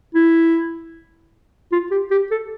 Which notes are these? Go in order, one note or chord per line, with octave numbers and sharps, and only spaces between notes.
E4
F4
G4
G4
A4